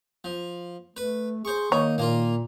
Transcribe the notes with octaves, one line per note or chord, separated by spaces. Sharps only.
F3
A3 B4
G#4 C5 C#6
D#3 A#3 D#4 C#5
A#2 A#3 F4